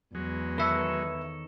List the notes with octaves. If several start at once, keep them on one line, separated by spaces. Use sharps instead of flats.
E2 F#3 G#3
D#3 A4 B4 C#5 E5